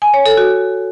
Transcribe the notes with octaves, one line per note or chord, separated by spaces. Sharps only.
G#5
C#5
A4
F#4